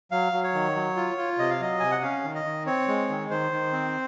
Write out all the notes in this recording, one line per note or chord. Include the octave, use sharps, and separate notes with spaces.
F#3 F5
F#3
C#5
D#3
F#3
F4
F4
C3 D#5
F5
F#3 D#5
C3 G#5
F#5
C#4 F5
D#3
D#5
D#3
C4 C#5
G#3
D#3
D#3 C5
D#3
C4